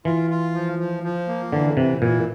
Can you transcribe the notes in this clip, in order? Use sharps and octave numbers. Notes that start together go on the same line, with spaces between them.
E3 F4
F4
F3
F3
F3
A#3
D3 E3
C3 E3
A#2 E3